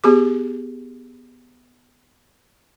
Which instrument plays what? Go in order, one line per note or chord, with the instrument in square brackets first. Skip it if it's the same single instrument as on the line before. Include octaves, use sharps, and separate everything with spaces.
[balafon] B3 G4 G#4 D6